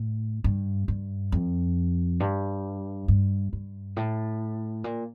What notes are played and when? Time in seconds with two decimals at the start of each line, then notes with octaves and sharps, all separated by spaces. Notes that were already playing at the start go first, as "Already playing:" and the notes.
Already playing: A2
0.44 G2
0.88 G2
1.32 F2
2.20 G2
3.08 G2
3.53 G2
3.97 A2
4.84 A#2